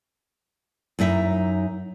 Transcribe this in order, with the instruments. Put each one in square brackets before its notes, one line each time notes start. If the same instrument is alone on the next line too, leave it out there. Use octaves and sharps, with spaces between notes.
[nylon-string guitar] F#2 D#4 E4 E5